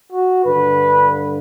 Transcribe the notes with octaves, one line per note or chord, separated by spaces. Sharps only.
F#4
G2 D3 B4